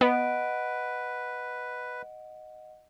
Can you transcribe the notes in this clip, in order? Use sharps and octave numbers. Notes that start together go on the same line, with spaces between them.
B3 B4 D#5 F#5 D7